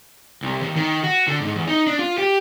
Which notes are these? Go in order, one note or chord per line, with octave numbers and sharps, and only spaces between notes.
C2
D#2
D#3
F#4
D3
G#2
E2
D#4
D4
F4
G4